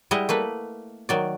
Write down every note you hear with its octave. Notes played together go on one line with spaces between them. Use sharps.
G3 G#3 E4 D#5 F#5
A3 A#3 B4
D#3 F#3 D5